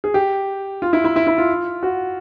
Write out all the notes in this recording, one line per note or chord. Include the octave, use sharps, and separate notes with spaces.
G#4
G4
F4
E4
E4
E4
E4
F4
F#4